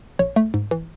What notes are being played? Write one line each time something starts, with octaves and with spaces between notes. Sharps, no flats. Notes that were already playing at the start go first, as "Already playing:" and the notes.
A#1 C#5
A3
G#2
E3